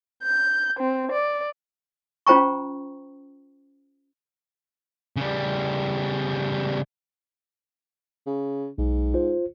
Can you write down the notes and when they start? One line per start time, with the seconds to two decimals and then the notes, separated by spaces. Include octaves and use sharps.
0.22 G6
0.80 C4
1.12 D5
2.27 C#4 F4 C5 G5 A#5 C#6
5.16 C#3 G3
8.26 C#3
8.78 B1 G#2
9.14 F4 C5